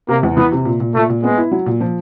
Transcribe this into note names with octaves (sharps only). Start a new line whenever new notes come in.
C3 A#3
E2
E3 B3
C3
A#2
A#2
A#2 A3
A#2
G#3 B3
E4
F#3
A#2
F3